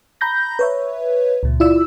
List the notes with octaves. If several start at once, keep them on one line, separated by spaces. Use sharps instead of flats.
A#5 B5 G6 A#6
B4 C#5 E5
C#2 A#2
E4 F4 D5 E6